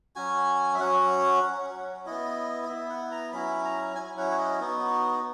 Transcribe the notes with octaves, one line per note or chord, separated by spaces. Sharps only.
F#3 C#4 F#4 G#5
E5
F#3 C#4 F#4 F#5
F#3 C#4 F#4
B3 E4 D#5
D#5
B3 E4 E5
F#5
A#5
F#3 C#4 E4 B5
A#5
F#3 C#4 E4 G#5
F#5
C#5
D#5
B3 D#4 F#4